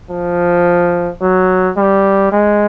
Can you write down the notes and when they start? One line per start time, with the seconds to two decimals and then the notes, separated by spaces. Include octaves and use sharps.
0.11 F3
1.21 F#3
1.77 G3
2.32 G#3